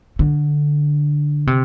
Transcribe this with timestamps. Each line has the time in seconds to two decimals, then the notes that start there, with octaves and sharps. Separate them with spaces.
0.19 D3
1.47 C3